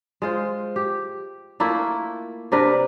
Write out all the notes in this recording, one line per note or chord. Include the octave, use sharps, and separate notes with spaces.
G#3 F4 C5
G4
A3 A#3 E4 F4
C3 D4 A#4 B4